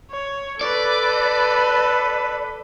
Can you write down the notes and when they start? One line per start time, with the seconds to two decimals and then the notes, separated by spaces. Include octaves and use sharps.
0.11 C#5
0.61 A4 B4 D5